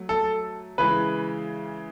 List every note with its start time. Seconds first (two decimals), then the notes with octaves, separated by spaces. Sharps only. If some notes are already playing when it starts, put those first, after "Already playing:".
Already playing: F#3 A3
0.09 A4
0.78 C#3 E3 G#3 B4